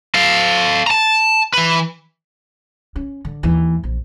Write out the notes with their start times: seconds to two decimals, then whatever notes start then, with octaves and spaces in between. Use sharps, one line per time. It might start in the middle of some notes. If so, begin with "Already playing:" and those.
0.15 A4 F5
0.87 A5 A#5
1.54 E3 B4
2.96 C#4
3.25 D3
3.43 D#2 E3
3.83 A#1